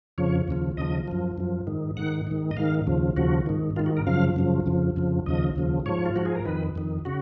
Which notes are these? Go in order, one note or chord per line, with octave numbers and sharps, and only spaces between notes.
F2 C#3 F3 C#5
D#2 C#3 F3
D#2 C#3 F3 D#5
F#2 F3
F#2 F3
G#2 D#3
G#2 D#3 F#5
G#2 D#3
D#5
G#2 D#3 F5
D#2 C#3 F3
D#2 C#3 F3 F#4
G#2 D#3
G#2 D#3 F4
F#4
A#4
F#2 C#3 F3 F5
F#2 C#3 F3
F2 C#3 F3
F2 C#3 F3
D#2 C#3 F3 D#5
D#2 C#3 F3
G#2 F3 C#5
F4
G#2 F3 F#4
G#4
A#4
F2 D#3 B4
F2 D#3
C#3 F#4